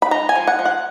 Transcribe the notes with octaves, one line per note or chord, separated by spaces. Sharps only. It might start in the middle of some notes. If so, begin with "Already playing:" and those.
B5
D#4 A#5
G#5
F3
F#5
F3
F#5